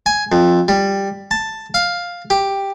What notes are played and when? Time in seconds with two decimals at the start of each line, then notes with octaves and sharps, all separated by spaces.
0.06 G#5
0.32 F2
0.68 G3
1.31 A5
1.74 F5
2.30 G4